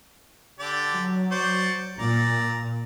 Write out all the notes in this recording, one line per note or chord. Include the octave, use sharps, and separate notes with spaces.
D3 G4 D5
F#3
C5 D5 C#6
A#2 D5 A#5